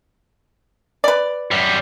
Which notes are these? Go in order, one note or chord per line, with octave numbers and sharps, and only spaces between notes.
B4 D5
F#2 G3